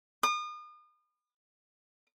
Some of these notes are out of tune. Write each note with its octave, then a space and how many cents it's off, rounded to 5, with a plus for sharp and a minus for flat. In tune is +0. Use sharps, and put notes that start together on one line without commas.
D#6 -40